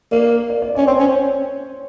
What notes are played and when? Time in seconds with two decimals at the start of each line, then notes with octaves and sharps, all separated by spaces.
0.12 A#3 D5
0.50 D5
0.62 D5
0.75 C#4 D5
0.87 C4 C#5
0.97 C5
1.00 C#4